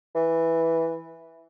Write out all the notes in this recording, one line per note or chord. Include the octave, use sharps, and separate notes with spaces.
E3